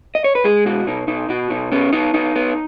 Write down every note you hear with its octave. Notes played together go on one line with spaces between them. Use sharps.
D#5
C#5
B4
G#3 G#4
B2 F#4
B2 D#4
B2 D#4
B2 F#4
B2 D#4
B3 C#4
B3 D#4
B3 D#4
B3